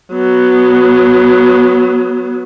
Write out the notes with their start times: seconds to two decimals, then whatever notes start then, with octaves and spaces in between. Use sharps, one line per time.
0.12 F#3 B3